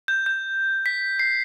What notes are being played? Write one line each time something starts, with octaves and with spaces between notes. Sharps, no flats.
G6
G6
B6
C7